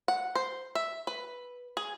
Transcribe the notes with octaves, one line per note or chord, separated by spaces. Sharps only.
F#5
C5
E5
B4
G#4